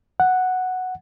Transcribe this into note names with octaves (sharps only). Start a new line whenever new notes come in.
F#5